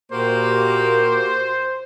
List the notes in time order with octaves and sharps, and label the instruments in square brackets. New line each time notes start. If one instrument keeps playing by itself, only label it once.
[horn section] A#2 A#3 [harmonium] F#4 G4 [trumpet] C5